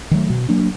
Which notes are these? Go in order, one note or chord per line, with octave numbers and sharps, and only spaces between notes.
D#3 F#3 A3
B2
F#3 A#3 D4